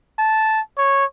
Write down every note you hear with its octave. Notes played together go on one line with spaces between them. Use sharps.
A5
C#5